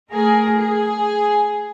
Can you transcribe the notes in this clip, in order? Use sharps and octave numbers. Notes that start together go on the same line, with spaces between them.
A3 G#4 A#4
G#4